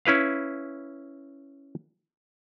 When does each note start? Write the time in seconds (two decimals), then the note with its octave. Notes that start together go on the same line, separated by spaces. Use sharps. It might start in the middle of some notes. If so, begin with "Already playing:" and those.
0.05 C#4 E4 B4 F5